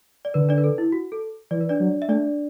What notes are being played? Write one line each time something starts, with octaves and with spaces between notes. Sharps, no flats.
D5
D3 B4
D4 D5
B4
A4
E4
F#4
A4
E3 D5
B4
D4 D5
F#3
E5
A3 D4 D5